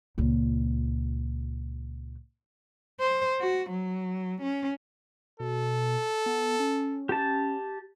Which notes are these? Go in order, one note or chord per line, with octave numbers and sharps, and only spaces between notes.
C#2 A#2
C5
F#4
F#3
C#4
B2 A4
B3
C#4
G4 A5